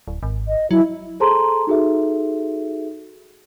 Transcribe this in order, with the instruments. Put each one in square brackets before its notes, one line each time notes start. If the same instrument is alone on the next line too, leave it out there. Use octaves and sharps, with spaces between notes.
[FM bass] D1
G#1
[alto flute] D#5
[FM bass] F#3 [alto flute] E4
[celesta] G#4 A4 C5 A5 A#5 C6
D#4 F#4 G#4 A4 E5